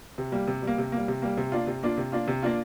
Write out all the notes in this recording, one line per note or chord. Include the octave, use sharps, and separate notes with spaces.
C3
G3 A#3
C3
G3
A#3
C3
G3 A#3
C3
G3 A#3
C3
A#3 D4 F4
C3
A#3 D4 F4
C3
A#3 D4 F4
C3
A#3 D4 F4